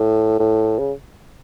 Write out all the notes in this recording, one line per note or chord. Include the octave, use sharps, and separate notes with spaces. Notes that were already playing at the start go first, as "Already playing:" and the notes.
Already playing: A2
A2
C#3